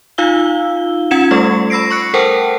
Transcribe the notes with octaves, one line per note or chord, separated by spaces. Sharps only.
D#4 F4 F5 E6 G7
C#4 F4 F#5 G#6 C#7 E7
G3 A3 A4 C#6
B5 E6 A#6 C7 D7
C#6 F#6 C#7
A4 A#4 C5 F#5 G5 A5